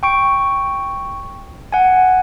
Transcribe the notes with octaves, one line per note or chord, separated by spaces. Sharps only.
G5 C#6 D7
F#5 G#5